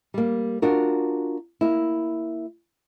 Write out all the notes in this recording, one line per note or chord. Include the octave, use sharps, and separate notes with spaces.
G3 A#3
D4 F4 F#4 A#4
A#3 E4